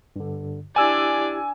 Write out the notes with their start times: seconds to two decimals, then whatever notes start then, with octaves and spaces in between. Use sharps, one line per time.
0.16 G2 D3
0.76 D4 E4 G4 D5 G#5 E6 G#6